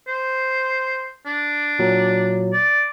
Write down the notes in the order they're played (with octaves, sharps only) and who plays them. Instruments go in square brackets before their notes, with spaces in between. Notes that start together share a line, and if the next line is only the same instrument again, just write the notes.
[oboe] C5
D4
[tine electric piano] A#2 F#3
[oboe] D5